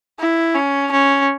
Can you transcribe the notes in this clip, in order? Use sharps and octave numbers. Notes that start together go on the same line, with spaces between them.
E4
C#4
C#4